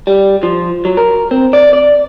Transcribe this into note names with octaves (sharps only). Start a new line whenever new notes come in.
G3
F3
F#3
A#4
C4
D5
D5